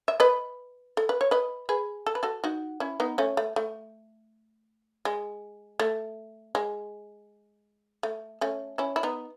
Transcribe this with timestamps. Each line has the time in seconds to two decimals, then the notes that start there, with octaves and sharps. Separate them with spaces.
0.08 E5
0.20 B4 D#5
0.97 A4
1.09 B4
1.21 C#5
1.31 B4 D#5
1.69 G#4 B4
2.06 A4
2.15 B4
2.23 F#4 A4
2.44 D#4 F#4
2.80 C#4 E4
3.00 B3 D#4
3.18 A3 C#4
3.37 A3
3.56 A3
5.05 G#3
5.80 A3
6.55 G#3
8.03 A3
8.41 A3 C#4
8.78 C#4 E4
8.96 E4
9.03 B3 D#4